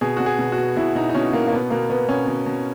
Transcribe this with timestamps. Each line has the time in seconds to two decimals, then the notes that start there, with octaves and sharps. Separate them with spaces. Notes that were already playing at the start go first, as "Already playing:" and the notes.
0.01 B2 G#4
0.17 B2 F#4
0.26 G#4
0.38 B2
0.52 F#4
0.58 B2
0.76 B2 E4
0.95 B2 D#4
1.09 D#4
1.14 B2 C#4
1.33 B2 A#3
1.47 A#3
1.52 B2 B3
1.70 B2 A#3
1.90 B2 B3
2.08 B2 C#4
2.27 B2
2.46 B2